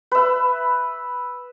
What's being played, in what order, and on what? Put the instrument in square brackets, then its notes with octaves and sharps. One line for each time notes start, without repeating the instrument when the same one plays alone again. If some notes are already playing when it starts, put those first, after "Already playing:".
[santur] B4 E5